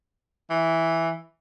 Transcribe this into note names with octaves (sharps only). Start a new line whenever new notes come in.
E3